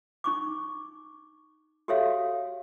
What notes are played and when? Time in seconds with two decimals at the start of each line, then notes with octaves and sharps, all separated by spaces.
0.24 D#4 C#6 D6
1.88 F#4 G4 A4 C#5 E5 F5